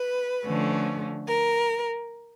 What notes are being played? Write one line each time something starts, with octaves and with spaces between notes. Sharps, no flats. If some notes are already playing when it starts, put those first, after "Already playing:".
Already playing: B4
D3 F3 A3 C#4
A#4